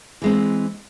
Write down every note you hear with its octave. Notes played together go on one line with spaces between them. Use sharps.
E3 G#3 C4